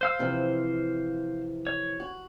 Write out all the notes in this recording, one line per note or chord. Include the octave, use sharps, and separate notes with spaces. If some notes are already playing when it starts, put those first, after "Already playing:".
C5 F5 E6
C3 E3 F3
C#5
F#4